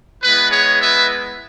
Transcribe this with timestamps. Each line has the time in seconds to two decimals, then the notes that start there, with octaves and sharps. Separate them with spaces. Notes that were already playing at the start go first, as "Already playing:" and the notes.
0.22 G#3 B3 E4 B4
0.51 G#4 C#5
0.81 B4 E5